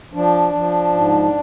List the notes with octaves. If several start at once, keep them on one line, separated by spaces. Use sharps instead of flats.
F3 D4
F3
G#2